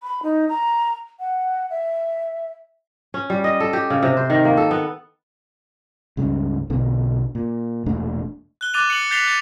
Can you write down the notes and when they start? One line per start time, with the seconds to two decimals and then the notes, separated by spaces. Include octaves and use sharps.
0.03 B5
0.23 D#4
0.49 A#5
1.20 F#5
1.70 E5
3.14 C#4
3.30 G3
3.44 D#5
3.60 A4
3.73 G4
3.90 C#3
4.03 C3
4.17 C5
4.30 D#3
4.45 A#3
4.57 A4
4.71 B3
6.17 C#2 G2 C#3
6.70 B1 B2 D3
7.35 A#2
7.86 E1 A#2 A3 D4
8.61 F#6 G7
8.74 D6 F#6 A6 D#7 F7
8.90 C#7 F#7
9.11 G6 A6 B6 C7 F7 G7
9.28 F#6 G6 A6